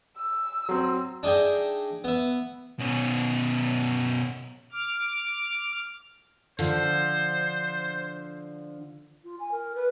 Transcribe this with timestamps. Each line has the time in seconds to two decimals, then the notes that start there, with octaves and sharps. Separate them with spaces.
0.17 E6
0.69 F#3 C4
1.23 D4 D#4 G#4 E5 G5
2.04 B3 E5
2.79 B2 C#4
4.72 D6 F6
6.59 D3 F3 C5
9.24 F4
9.39 G#5
9.51 A#4
9.75 B4